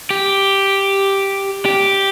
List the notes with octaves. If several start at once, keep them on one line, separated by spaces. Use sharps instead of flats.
G4
G4